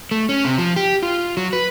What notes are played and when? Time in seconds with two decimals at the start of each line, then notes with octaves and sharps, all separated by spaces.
0.11 A3
0.29 C#4
0.45 C3
0.58 F3
0.76 G4
1.03 F4
1.37 F#3
1.53 B4